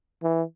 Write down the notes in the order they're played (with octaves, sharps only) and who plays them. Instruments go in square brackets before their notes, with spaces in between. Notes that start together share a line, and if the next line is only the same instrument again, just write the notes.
[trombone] E3